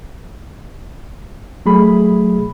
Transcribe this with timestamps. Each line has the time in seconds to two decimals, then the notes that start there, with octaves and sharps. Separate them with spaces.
1.66 F#3 A3 G#4 B5